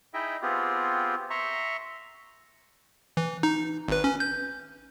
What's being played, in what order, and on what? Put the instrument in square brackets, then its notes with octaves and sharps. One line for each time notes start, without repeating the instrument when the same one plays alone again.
[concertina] D#4 E4 G#4 D#5 E5 G5
B3 C4 F4 G4 G#4
E5 A#5 C6 C#6
[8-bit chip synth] E3
D#4
G#1 B4
C#4
G6